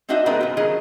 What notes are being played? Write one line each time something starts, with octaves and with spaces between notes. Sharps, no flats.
C4 D4 D#4 F#4 D#5 E5
G#3 B3 C4 F#4 A#4 B4
A#2 F3
D#3 F#3 G#4 D#5